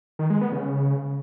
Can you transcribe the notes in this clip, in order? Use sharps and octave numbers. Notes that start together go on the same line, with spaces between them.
D#3
G#3
B3
C#3